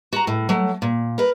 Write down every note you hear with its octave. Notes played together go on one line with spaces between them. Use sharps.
F#4 A#5
A2
F#3 A3
A#2
A#4 B4